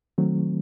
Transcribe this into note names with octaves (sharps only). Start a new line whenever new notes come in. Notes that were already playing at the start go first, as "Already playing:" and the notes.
D#3 F#3 A3 C4